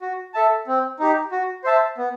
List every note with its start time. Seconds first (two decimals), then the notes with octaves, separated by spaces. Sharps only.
0.02 F#4
0.34 A4 E5 A5
0.67 C4
1.00 D#4 G4
1.32 F#4
1.64 C5 E5 A5
1.98 B3